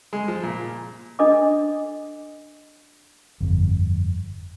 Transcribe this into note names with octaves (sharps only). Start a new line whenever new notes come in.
G#3
F3
A#2
D4 A4 D#5 D6
G1 F2